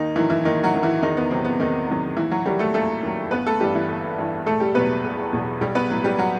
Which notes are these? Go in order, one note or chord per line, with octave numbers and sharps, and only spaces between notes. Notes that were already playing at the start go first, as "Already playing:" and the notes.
Already playing: D#2 D#3 D#4
D#3 E3 F#3 E4
E3 E4
D#2 D#3 D#4
F#3 F#4
D#3 F#3
E3 E4
E2 D#3 D#4
B3
C3 D#3 F#3 C4
B3
E2 D#3 D#4
C3 D#3 F#3
D#2 E3 E4
F#3 F#4
D#3 F#3 G3 G4
A3 A4
D#2 A3 A4
D#3 F#3
G1 B3 B4
A3 A4
G2 E3 G3 G4
E3 E4
G1
G2 E3
E1 A3 A4
G3 G4
E2 B2 F#3 B3 B4
E1
E2 B2 F#3
B1 G3 G4
B3 B4
A2 F#3
G3 G4
F#3 F#4